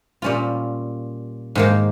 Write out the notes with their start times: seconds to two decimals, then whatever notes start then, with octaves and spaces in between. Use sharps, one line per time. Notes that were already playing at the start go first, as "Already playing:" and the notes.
0.22 A#2 G3 C#4 F4
1.55 G#2 D#3 A#3